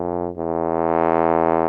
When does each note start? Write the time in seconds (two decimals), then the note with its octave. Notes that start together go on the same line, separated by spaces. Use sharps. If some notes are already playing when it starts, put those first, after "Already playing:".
Already playing: F2
0.37 E2